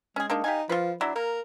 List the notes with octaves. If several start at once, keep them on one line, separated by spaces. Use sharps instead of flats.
G#3 C#4 G#4
A#3 D4 D#4
D#4 G4 F5 G#5
F3 F4 B4
F#3 D4 E4
A#3 A#4